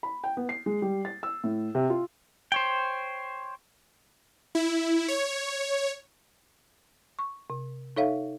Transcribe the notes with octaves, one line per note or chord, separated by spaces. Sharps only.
B5
G5
B3
C7
G#3
G3
A6
E6
A2
C3
F4
C5 C#5 G5
E4
C#5
C#6
C3
D#4 A4 C#5 E5 F5